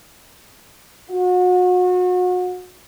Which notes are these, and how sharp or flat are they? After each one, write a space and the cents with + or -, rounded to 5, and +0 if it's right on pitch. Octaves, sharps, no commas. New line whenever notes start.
F#4 -35